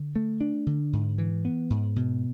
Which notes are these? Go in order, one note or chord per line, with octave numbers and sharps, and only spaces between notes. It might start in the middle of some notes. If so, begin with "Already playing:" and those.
Already playing: D3
A3
D4
D3
G#2
E3
B3
G#2
B2